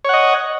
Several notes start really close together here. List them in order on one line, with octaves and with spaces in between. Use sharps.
C#5 F#5 D#5